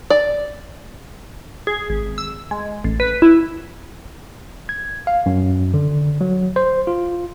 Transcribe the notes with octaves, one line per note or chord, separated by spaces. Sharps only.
D5
G#4
G#1
E6
G#3
A1
B4
E4
G#6
F5
F#2
D3
F#3
C5
F4